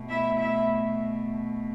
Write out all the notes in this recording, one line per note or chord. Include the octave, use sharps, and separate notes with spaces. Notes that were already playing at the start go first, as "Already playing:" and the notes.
Already playing: B2 A3
E4 E5
E4 E5